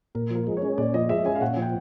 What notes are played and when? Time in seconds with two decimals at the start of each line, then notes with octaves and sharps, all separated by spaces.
0.15 A#2 A#4
0.30 F3 A#4
0.47 G#3
0.57 C#5
0.62 C#4
0.78 A#2 D5
0.94 F3 D#5
1.09 G#3 E5
1.25 C#4 G#5
1.35 F5
1.41 A#2 F#5
1.57 F3
1.62 G5